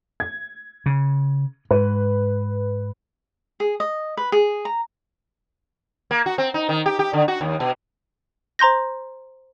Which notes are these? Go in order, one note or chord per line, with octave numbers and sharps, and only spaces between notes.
G#6
C#3
G#2 B4
G#4
D#5
B4
G#4
A#5
A#3
F#4
C4
D#4
D#3
G4
G4
D3
F#4
D#2
B2
C5 A#5 C6 G6 A#6